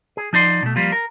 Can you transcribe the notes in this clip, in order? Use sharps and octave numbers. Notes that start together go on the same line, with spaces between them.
G#4
F3 D#4 D5 C6
B2 A3
F3 G3 A#3 F4
A#4